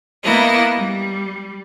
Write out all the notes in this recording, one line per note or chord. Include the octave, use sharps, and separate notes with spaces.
A#3 B3 E4 D#5
G3